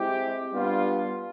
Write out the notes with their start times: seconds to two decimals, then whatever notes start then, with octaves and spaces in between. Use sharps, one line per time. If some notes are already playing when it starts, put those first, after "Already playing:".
Already playing: G#3 C4 E4 G4
0.51 G3 B3 D4 F4